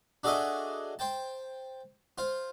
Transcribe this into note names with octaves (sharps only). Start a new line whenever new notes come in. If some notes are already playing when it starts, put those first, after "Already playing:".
D4 F#4 G#4 A4 D#5 E5
C5 G5 A5
F4 C5